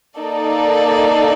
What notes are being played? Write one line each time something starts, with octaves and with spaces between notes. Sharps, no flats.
A#3 D#4 A4 D5